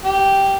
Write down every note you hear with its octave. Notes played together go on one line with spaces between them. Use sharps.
G4